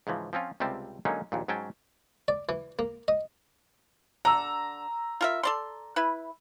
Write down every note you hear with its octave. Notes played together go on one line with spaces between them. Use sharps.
G#2 C#3 E3 F3
F3 C4 C#4 F4
C#2 C3 G3 C4 A5
D3 F#3 G#3 A#3 C#4 D#4
A#1 D#2 A#2
G#2 F#3 C#4 G5 A5
D5
E3
A#3
D#5
D3 A#5 E6
F4 A#4 E5
A4 D5 C6
E4 B4